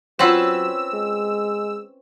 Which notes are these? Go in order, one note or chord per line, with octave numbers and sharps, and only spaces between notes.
F#3 C4 C#4 F4 B4 F#5 C6 E6
G#3